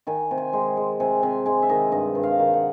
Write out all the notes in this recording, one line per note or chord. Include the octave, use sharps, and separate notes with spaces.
D#3 G#5
C3
G#5
G#3
G#3
C3 G#5
C3 G#5
G#3 G#5
E5
D#3 D#5
G2 D#5
G2
F5
D#3
F#5